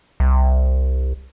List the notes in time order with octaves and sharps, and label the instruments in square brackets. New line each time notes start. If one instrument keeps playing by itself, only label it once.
[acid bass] C2